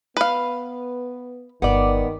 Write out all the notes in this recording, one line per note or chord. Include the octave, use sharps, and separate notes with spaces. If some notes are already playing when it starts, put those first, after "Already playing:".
B3 B4 F5
G1 D#3 B3 D5